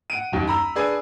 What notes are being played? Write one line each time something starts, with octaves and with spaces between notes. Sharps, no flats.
F#5 D7 D#7
F#1 D#2
A#5 B5 E6
D4 G#4 B4 G#5